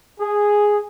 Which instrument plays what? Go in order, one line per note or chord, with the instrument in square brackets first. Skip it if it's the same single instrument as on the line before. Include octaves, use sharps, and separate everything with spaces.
[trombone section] G#4